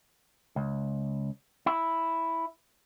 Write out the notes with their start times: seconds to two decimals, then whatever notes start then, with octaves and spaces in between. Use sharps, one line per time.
0.56 C#2
1.66 E4